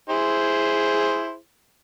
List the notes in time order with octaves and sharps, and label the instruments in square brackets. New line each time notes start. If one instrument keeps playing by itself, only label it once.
[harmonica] E4 G#4 C5